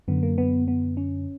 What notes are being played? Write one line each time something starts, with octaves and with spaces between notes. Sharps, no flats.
F#2 D3 B3
A#3
B3
B3
C#4